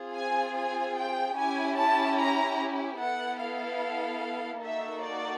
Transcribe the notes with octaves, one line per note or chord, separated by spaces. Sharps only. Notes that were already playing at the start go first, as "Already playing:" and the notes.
Already playing: C4 F4 G#4
G#5
G#5
G5
C#4 E4 G4 G#5
A5
A#5
B3 E4 A4 F#5
F5
A#3 D#4 F#4 A4 E5
D5